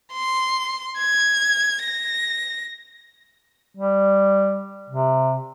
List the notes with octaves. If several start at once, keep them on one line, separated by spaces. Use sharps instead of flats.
C6
G#6
A#6
G3
C3